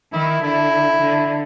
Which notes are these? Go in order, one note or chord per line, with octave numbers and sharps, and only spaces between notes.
D#3 E4
D3 E4
D3